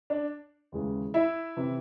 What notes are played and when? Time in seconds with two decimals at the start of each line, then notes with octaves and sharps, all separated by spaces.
0.10 D4 D5
0.72 D#2 C#3 E3 G#3
1.14 E4 E5
1.57 C3 E3